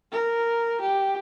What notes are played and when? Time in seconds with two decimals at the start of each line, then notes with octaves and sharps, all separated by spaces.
0.12 A#4
0.81 G4